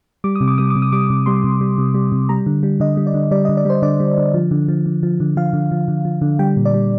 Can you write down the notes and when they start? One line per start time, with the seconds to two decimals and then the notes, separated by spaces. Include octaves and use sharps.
0.24 G3 D6
0.35 D#6
0.41 C3
0.48 D6
0.58 G3 D#6
0.70 D6
0.76 C3
0.82 D#6
0.92 G3 D6
1.10 C3
1.26 G3 C6
1.44 C3
1.61 G3
1.78 C3
1.94 G3
2.12 C3
2.29 G3 A#5
2.46 D3
2.63 G3
2.80 D3 D#5
2.97 G3
3.07 D5
3.14 D3
3.31 G3 D5
3.45 D#5
3.49 D3
3.57 D5
3.65 G3 C5
3.82 D3 D5
4.00 G3
4.18 D3
4.34 F3
4.51 D3
4.68 F3
4.86 D3
5.03 F3
5.20 D3
5.37 F3 F5
5.53 D3
5.71 F3
5.88 D3
6.05 F3
6.21 D3
6.39 G3 G5
6.57 A#2
6.65 D5
6.74 G3